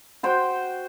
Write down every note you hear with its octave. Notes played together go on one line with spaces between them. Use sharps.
F#4 C5 G5